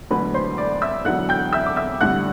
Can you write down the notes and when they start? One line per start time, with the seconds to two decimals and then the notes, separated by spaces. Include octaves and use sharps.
0.10 E1 D2 D3 F#3 B4 B5
0.34 C5 C6
0.57 D5 D6
0.82 E5 E6
1.05 E1 E2 D3 F#3 F#5 F#6
1.29 G5 G6
1.53 E5 E6
1.66 D6
1.76 E5 E6
2.01 A1 G2 D3 G3 F#5 F#6